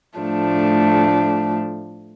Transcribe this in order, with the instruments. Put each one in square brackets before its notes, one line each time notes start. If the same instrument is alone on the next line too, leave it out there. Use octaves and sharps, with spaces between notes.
[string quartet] A2 F3 A3 D4